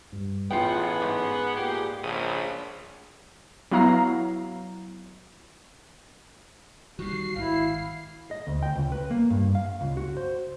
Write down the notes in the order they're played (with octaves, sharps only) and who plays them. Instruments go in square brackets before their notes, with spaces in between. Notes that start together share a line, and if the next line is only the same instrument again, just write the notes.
[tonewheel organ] G2
[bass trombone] A1 [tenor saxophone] B3 [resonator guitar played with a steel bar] F4 G5 [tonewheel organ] G#4 F#5
[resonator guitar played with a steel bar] G#2
[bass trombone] A#2 [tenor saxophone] G4
[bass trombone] A#1 [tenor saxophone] C#3 [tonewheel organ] B5 D#6
[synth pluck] F#3 B3 E4 F5 A#5 C7
[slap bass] D#3 G3 [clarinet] F#4 [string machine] C7
[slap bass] G#1 [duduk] E4 [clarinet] F5
[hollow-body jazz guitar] D#5
D2
G5
C#2
B4
A#3
G2
F5
C#2
F#4
C5